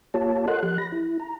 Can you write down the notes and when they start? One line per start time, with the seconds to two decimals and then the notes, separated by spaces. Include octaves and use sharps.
0.14 A#3 F4 G4 C#5 A5
0.48 A4 A#4 D#5 F#5 C6 F#6
0.63 F3 G4 F#6
0.78 B5 A#6
0.92 E4
1.20 A#5